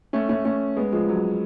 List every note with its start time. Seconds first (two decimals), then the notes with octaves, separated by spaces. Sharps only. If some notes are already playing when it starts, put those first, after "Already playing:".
0.13 A3 C#4
0.29 A3 C#4
0.45 A3 C#4
0.76 G#3 B3
0.92 F3 G#3
1.09 F#3